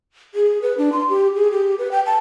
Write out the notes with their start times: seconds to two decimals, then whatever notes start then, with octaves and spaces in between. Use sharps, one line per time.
0.35 G#4
0.62 B4
0.78 D4
0.92 C6
1.09 G4
1.36 G#4
1.51 G4
1.78 B4
1.91 G5
2.06 A5